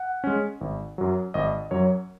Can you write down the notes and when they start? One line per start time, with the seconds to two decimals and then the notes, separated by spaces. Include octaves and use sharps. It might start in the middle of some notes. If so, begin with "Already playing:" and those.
Already playing: F#5
0.24 G#3 C#4
0.61 G#1
0.98 F#2 F#3
1.34 G#1 D#5
1.71 F#2 F#3 C#5